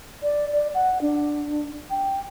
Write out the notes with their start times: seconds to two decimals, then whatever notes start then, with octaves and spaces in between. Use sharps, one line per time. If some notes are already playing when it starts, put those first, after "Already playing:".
0.22 D5
0.53 D5
0.74 F#5
1.01 D4
1.90 G5